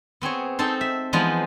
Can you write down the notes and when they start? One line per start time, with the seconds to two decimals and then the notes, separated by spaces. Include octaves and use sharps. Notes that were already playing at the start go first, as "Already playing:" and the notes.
0.21 B3 C4 G#4 C#5
0.59 C4 D#4 A4 C5
0.81 E5
1.13 E3 F3 G#3 B3 D#4 F4